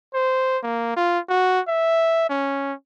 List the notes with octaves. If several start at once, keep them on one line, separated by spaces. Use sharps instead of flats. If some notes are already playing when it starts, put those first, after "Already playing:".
C5
A#3
F4
F#4
E5
C#4